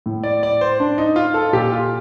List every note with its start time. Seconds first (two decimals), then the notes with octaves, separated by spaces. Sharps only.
0.06 A2
0.23 D5
0.43 D5
0.61 C5
0.80 D4
0.98 D#4
1.16 F4
1.34 A4
1.53 A#2 G4
1.72 F4